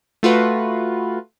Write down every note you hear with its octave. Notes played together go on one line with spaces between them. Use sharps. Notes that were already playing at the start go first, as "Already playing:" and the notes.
A3 F4 F#4 B4